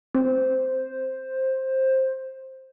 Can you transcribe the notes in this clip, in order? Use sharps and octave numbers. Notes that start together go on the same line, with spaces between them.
C4 C5